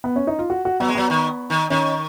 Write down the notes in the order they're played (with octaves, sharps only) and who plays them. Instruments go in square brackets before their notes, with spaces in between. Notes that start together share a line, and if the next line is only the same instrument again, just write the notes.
[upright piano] B3
C#4
D#4
F4
F#4
F#4
[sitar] F#3 [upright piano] B3
[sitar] G#3
[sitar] F#3 [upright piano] B3
[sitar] D#3
D#3
[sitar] D#3 [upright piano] C#4